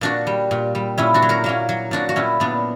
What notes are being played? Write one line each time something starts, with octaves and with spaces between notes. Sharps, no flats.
A#2 D4 F#4
G3
A#2
G3
A#2 C#4 E4
D4 F#4
F#3
F#4 A#4
F#3 A#3 C#4
F#3
A#2 D4 F#4
F#4
A#2 C#4 E4
A#2 B3 D4